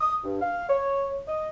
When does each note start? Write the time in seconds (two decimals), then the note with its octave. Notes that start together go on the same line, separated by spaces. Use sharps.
0.01 D#6
0.24 G2
0.41 F5
0.69 C#5
1.28 D#5